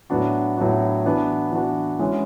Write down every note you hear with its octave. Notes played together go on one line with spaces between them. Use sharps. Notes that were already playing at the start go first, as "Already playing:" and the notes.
A2 F#3 B3 D4 F#4
A2 F#3 B3 D4 F#4
E3 B3 D4 F#4
E3 B3 D4 F#4
E3 G#3 C#4 F#4